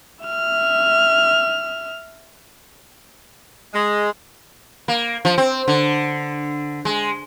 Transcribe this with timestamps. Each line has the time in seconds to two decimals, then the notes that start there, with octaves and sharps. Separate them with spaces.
0.24 E5 F6
3.74 G#3
4.88 A#3
5.25 F3
5.38 C4
5.68 D3
6.85 G#3